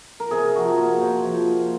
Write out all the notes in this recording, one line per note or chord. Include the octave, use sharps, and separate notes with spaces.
A#4
C3 G#4
F3 F#4
A#3 G#4
C3 C5
F3
A#3